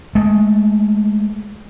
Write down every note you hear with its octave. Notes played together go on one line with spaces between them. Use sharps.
G#3 A3